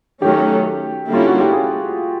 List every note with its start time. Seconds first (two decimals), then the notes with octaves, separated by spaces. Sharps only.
0.22 D#3 F#3 A3 C#4 G4
1.09 D3 G3 A#3 C#4 E4 F4
1.27 F#4
1.40 G4
1.53 G#4